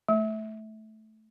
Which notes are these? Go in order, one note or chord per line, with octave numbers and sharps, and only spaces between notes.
A3